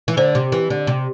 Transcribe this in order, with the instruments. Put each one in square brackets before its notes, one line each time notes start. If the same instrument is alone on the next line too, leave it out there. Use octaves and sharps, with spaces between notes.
[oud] E3
[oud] D3 [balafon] C5
[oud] C3
E3
D3
C3